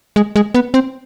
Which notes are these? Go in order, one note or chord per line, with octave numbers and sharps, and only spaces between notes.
G#3
G#3
B3
C4